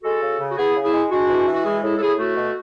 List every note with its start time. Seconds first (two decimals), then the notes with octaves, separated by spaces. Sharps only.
0.03 G#3 F#4 A4
0.22 C#3
0.40 C#3
0.50 F#4
0.57 B3 E4 G#4
0.76 C#3
0.84 E4 G#4
0.94 G#3
1.11 G#3 D4 F#4
1.29 E3
1.47 E3
1.53 F#4
1.64 G#3 E4 G#4
1.82 A2 E4 G#4
1.96 A4
2.00 A2 E4 G#4
2.18 A3 F#4 A4
2.37 B2